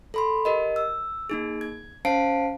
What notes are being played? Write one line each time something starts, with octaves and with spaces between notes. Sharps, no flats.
A4 B5 C6
G4 A#4 D#5
E6
A#3 D#4 G#4
G#6
C#4 C5 F5 A5 C7 D7